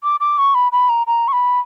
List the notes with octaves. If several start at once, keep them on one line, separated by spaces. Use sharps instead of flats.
D6
D6
C#6
B5
B5
A#5
A#5
C#6
B5